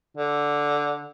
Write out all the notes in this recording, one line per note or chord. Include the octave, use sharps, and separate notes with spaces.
D3